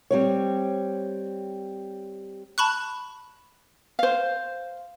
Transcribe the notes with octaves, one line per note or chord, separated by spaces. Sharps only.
G3 C4 C#5
A5 B5 C#6 F#6
C5 F5